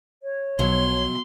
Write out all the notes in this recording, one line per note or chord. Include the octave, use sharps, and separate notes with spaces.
C#5
B1 B2 F3 F#3 C6